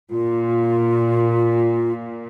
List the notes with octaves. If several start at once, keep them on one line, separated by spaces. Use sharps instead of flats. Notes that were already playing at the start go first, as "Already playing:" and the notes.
A#2 F4